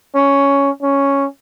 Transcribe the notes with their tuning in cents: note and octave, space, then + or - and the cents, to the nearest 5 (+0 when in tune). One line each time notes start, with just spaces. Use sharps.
C#4 +5
C#4 +0